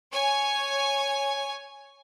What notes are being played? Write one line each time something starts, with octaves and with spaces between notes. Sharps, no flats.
C#5 G#5